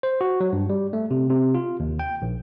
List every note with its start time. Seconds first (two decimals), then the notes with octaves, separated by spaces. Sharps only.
0.03 C5
0.21 F#4
0.41 F#3
0.53 G2
0.70 G3
0.93 A3
1.11 C3
1.30 C3
1.54 F4
1.80 D#2
1.99 G5
2.22 A#1